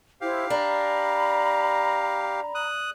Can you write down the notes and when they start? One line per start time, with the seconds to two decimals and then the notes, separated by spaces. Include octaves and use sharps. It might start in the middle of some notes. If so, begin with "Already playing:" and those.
0.21 E4 G4 C5 F5
0.50 D4 A#5 B5
2.55 D#6 F#6